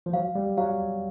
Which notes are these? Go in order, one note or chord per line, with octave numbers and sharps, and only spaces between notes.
F3
F#3 F5
G3
F#3 F5